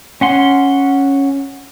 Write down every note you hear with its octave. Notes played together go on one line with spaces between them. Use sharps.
C#4 F#5 C6